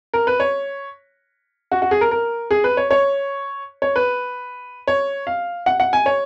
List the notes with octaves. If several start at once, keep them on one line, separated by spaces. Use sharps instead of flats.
A#4
B4
C#5
F#4
F#4
G#4
A#4
A#4
G#4
B4
C#5
C#5
C#5
B4
C#5
F5
F#5
F#5
G#5
C#5